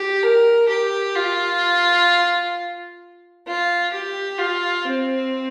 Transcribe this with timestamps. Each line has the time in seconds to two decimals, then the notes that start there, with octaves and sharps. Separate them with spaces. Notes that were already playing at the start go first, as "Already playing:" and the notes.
Already playing: G4
0.23 A#4
0.69 G4
1.16 F4
3.47 F4
3.93 G4
4.38 F4
4.85 C4